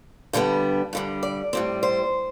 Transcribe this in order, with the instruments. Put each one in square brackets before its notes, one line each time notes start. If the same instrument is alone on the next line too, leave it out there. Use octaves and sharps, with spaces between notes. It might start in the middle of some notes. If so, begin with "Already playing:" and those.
[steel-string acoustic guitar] G2 D3 G3 B3
G2 D3 G3
D5
A2 G3 C4
C5